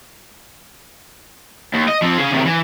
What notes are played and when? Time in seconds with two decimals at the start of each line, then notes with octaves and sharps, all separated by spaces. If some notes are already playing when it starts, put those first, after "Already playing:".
1.74 D#2
1.88 D#5
2.02 F3 C4
2.18 C#3 G#4
2.32 C3 D#3
2.45 E3